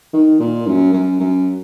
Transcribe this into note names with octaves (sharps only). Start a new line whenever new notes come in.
D#3
A#2
F#2
F#2
F#2